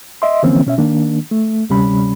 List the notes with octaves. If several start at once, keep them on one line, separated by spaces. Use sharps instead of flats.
D#5 E5 C6
D3 E3 F3 A#3 C4 C#4
B2 C#4 E5
D#3 A#3 D4
A3
D2 C3 G3 C#4 B5